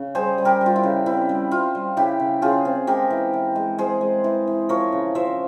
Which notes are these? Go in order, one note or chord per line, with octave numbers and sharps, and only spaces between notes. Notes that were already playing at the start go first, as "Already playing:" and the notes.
Already playing: C#3
G3 G#4 C5
G3
G4 A#4
G3
F4
E4
C#3
C4 E4
G3
C4 F4
G3
C#3 E4 G4
C#3
C#3 F4 G#4
C4
G#3 G4 A#4
E3
E3
G#3
G#3 G#4 C5
G#3
E3
E3
F3 A#4 C#5
C#3
F3 C5 E5